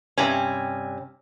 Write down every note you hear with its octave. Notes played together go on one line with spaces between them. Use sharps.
G2 C3 C#4